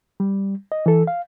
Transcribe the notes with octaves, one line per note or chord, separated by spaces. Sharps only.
G3
D#5
E3 A4
F5